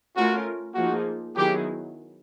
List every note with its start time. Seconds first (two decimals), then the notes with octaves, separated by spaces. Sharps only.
0.16 A3 C#4 F4 F#4 A#4
0.75 F3 A#3 D#4 F#4 G#4
1.36 D#3 F#3 B3 E4 G4 G#4